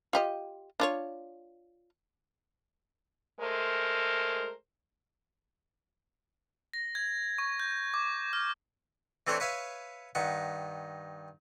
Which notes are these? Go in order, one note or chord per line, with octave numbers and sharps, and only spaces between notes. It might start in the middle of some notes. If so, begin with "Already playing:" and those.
F4 G4 D#5
D4 F4 C#5
G#3 A3 A#4 C5
A#6
G#6
C#6
G6
D6
F6
E3 A3 C4 D4 C5 C#5
B4 C#5 E5 F5 G#5
G2 D#3 F#5